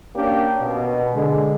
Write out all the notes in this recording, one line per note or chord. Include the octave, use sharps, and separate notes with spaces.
A#3 C#4 D4 G4
B2
D3 G#3